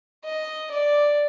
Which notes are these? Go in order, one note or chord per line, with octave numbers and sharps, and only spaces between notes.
D#5
D5